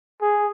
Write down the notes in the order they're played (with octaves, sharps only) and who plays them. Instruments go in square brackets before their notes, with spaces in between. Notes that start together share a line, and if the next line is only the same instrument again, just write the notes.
[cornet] G#4